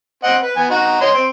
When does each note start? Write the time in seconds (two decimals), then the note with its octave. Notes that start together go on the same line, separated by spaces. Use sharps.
0.23 C4 D#5 F#5
0.42 B4
0.56 B3 G#5
0.70 D#4 F#4
1.01 C#5 D#5 C6
1.15 C4